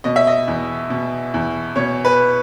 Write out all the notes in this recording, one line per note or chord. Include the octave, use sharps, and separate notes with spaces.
B2 D#5
E5
D#5
E2
B2
E2
B2 C#5
B4